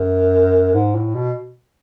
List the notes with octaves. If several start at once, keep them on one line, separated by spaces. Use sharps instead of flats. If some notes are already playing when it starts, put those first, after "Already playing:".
Already playing: F#2
G#2
A2
B2